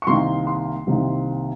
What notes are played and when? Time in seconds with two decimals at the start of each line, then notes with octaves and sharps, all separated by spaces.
0.02 C#6
0.07 C2 C3 D#3 A#3 C6
0.47 C6
0.87 C2 C3 D#3 A#3